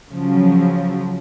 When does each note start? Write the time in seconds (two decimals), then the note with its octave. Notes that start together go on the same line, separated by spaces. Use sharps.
0.10 C#3 F3 F#3